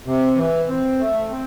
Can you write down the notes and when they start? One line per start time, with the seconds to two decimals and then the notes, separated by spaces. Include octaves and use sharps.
0.06 C3
0.36 E3
0.69 C4
0.99 A3
1.30 C4